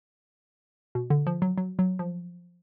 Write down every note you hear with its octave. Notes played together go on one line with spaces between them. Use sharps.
B2
D3
F3
F#3
F#3
F#3
F3